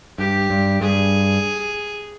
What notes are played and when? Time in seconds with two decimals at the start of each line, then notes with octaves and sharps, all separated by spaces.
0.18 G2 G4
0.50 G2
0.81 G2 G#4